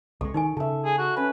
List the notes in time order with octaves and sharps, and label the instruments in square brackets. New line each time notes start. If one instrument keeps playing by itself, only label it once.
[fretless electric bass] C2 F3 G#3 [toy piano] A4 [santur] C#6
[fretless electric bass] D#3 [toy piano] D#4 A#4 G#5
[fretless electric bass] C#3 [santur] A4 E5
[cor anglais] G#4
F#4
[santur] C#4 [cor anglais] B4